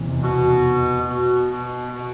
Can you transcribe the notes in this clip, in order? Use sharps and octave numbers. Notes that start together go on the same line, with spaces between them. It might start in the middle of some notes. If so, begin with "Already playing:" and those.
Already playing: F1 E2 C3 E3
B2
B2
B2
B2